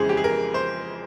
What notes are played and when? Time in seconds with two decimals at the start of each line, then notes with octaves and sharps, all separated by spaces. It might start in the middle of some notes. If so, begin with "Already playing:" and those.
Already playing: F2 C#3 E3 G#3 G#4 C5
0.09 G4
0.17 G#4
0.24 A#4
0.54 C5